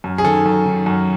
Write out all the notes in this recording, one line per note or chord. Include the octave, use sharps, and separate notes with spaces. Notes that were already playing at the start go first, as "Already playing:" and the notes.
F#2
G#4
D#3 A4
F#2
D#3
F#2